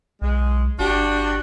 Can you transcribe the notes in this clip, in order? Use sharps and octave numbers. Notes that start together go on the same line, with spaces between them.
B1 G#3
G1 D4 F#4 G4